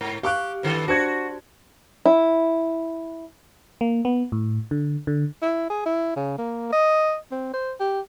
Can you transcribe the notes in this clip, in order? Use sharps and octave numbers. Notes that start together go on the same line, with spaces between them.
G#2
G4 F5 C#6 F#6
G2 D#3 A4
D4 F#4 C5 G#6
E4
A#3
B3
A2
D3
D3
E4
G#4
E4
C#3
A#3
D#5
C4
C5
G4